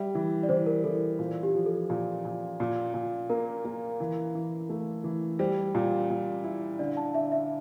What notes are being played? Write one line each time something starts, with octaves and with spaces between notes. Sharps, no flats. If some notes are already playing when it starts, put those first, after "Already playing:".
Already playing: G3 E5
E3
D5
E3 C5
A#4
E3 A4
A#2
G4
F3
A4
A#2
A#2
A#2
A#2
A#3 A#4
A#3
E3
E3
A3
E3
G3 C5
A#2
A#2
E4
D3 D5
A5
D3 E5
E5